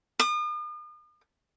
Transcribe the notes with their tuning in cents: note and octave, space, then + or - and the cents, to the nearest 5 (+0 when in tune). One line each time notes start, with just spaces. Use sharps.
D#6 -45